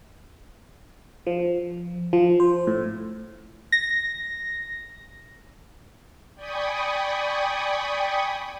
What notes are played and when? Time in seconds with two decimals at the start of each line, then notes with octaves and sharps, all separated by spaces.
1.27 F3
2.13 F3
2.40 C5
2.67 A2
3.72 A#6
6.35 D5 G5 G#5 B5 C#6 D#6